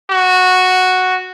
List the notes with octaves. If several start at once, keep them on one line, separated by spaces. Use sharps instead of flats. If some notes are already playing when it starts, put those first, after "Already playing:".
F#4